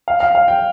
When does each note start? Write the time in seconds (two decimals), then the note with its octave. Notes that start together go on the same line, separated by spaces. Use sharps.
0.08 F5
0.20 F5
0.35 F5
0.48 G5